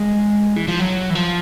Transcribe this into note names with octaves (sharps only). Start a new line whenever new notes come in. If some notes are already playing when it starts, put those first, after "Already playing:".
Already playing: G#3
E3
F3
F#3
E3
F3